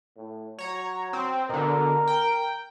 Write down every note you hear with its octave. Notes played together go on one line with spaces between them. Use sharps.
A2
F#3 C#5 A#5
C4
B2 D3 A#4
G5